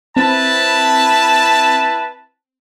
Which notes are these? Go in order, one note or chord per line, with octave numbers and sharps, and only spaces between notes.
C4 E4 B4 A5